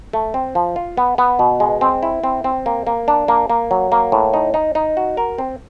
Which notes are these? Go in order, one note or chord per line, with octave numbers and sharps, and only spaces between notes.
A3
C4
F3
F4
B3
B3
B2
G#3
C4
E4
C4
C4
A#3
A#3
D4
A#3
A#3
F#3
A#3
A2
D#4
D#4
D#4
F#4
A#4
C4